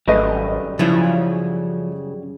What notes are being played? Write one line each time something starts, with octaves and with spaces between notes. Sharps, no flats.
G#1 F#2 G3 A3 B4 D#5
C#3 F3 F#3 E4